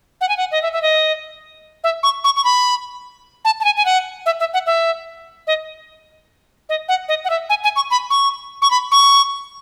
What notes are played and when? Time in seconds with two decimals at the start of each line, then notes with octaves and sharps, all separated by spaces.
0.21 F#5
0.29 G#5
0.37 F#5
0.51 D#5
0.62 E5
0.73 E5
0.82 D#5
1.84 E5
2.03 C#6
2.24 C#6
2.36 C#6
2.44 B5
3.45 A5
3.60 A5
3.65 G#5
3.77 G#5
3.85 F#5
4.26 E5
4.40 E5
4.53 F#5
4.66 E5
5.47 D#5
6.69 D#5
6.88 F#5
7.08 D#5
7.25 F#5
7.30 E5
7.49 G#5
7.64 G#5
7.76 C#6
7.90 B5
8.10 C#6
8.62 C#6
8.71 B5
8.91 C#6